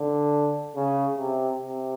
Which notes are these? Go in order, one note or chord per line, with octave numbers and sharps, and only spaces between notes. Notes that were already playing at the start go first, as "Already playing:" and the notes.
Already playing: D3
C#3
C3
C3